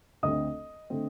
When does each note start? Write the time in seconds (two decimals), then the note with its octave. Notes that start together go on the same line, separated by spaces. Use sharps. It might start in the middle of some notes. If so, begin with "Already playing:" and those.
0.23 D2 D3 A3 C4 D#5 D#6
0.90 D3 A3 C4